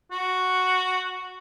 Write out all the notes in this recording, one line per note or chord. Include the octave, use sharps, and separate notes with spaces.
F#4